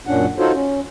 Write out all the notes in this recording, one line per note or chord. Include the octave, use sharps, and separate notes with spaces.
F#2 A#2 C#4 D4 F#5
D#4 F4 F#4 A4 C5 C#5
C#4